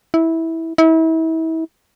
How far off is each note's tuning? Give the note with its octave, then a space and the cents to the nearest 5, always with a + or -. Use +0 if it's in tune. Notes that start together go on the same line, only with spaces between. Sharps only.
E4 -15
E4 -35